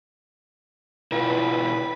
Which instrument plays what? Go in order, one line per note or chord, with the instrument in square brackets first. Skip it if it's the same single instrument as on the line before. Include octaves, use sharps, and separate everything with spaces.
[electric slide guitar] B2 E4 F4 [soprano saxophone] B4